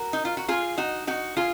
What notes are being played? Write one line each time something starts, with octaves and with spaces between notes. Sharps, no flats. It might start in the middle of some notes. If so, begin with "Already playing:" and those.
Already playing: F#4 A#4
D#4
F4
F#4
F4 G#4
D#4 F#4
D#4 F#4
F4 G#4